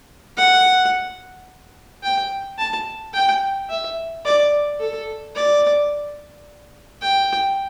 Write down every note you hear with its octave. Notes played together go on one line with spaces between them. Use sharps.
F#5
G5
A5
G5
E5
D5
A4
D5
G5